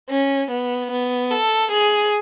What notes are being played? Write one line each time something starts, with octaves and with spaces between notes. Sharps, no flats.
C#4
B3
B3
A4
G#4